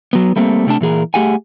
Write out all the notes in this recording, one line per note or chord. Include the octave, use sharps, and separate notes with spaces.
F#3 B3
G3 A3 A#3 C4
C3 A3 D4 A5
A#2 E3 G#4 A#4
A3 G4 G#4 F#5 G#5